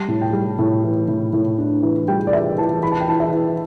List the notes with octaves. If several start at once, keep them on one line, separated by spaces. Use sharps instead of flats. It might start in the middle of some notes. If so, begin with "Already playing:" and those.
Already playing: G3 A5
A2
G5
G3
A2
E3
A2
A2
D4
E3
G3 G5
D5
E3 E5
E3 A5
E3 B5
A5
G5
E3 A5
E5
E3